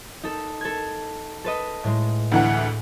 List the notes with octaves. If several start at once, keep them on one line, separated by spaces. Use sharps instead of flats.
D#4 A4
A4 G#6
A4 B4 D#5
A2 G#3
D2 E3 F#5